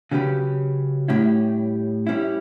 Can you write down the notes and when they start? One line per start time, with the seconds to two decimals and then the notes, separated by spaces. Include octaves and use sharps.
0.11 C#3 F#3 C#4 G4 B4
1.08 A2 G3 C#4 E4
2.07 G3 C#4 E4